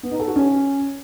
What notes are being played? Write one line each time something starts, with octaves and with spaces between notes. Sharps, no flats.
B3
D#4
A4
F#4
C#4